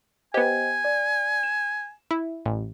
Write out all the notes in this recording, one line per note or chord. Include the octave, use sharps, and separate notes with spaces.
B3 G4 C5 D#5 G5 G#5
D5
E7
E4
A1